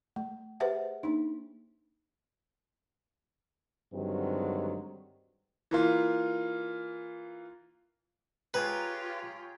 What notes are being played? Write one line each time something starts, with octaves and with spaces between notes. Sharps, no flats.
A3
G4 G#4 B4 C5 E5 F#5
A#3 D4 D#4
G2 D3 D#3 F#3 G#3 C4
E3 A#3 F4
F4 G4 G#4 B4 C#5 G5 A#5